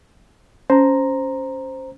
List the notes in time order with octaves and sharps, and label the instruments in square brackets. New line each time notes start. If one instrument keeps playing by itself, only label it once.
[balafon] C#4 [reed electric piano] C5 A#5